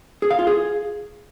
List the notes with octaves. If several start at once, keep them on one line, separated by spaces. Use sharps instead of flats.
G#4
F5
F4
G#4